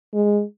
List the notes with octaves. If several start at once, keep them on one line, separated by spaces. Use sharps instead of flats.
G#3